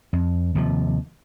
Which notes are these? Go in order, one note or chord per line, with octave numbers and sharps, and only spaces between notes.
F2
D#2 C3 F3